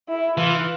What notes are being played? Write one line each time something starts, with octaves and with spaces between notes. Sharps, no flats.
E4
E3 F4